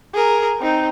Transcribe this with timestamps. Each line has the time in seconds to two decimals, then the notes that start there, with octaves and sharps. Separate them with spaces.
0.14 G#4 A#4
0.60 C4 D#4